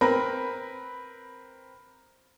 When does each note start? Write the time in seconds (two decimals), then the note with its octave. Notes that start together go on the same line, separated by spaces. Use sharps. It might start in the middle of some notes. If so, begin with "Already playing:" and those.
0.01 C4 A#4 B4 B5